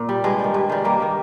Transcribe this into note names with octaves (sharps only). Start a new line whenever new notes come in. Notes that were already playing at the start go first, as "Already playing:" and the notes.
Already playing: A#2
G3
G2 G#3
D#3 G3
G2
D#3 G3 G#3
G2 G3 A#3
D#3 G3